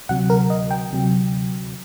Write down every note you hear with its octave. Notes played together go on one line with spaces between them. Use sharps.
D2 C3 F#3 F#5
A#4
D#5
G5
D2 C3 F#3